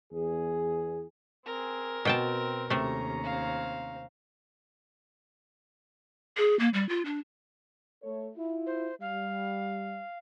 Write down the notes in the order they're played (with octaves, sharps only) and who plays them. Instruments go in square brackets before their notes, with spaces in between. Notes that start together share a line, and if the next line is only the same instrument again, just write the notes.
[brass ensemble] E2 G#4
[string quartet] C4 G#4 [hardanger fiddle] A#4
[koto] B2 G5 A5 [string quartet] C4
[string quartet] D#2 C#4 A#5 [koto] C3 A3
[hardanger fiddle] C4 F5
[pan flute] G#4
A#3
G3
F4
D4
[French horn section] A3 A4 C#5
E4 F4
[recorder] C5
[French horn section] G3 [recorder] F5